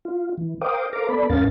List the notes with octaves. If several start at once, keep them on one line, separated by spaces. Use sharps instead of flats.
F4
E3
A#4 C5 F5 G5 D6 D#6
A4 A#4 C5 F5 A#5 D6
B3 A4 D5 B5
E2 G#2 C#4 A#4 F5 A6